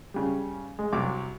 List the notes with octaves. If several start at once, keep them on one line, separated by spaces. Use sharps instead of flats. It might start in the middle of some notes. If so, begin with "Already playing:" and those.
C#3 G3
G#3
C2 F#3 D6